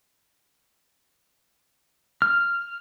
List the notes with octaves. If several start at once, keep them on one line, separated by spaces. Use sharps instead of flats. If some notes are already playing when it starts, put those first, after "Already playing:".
F6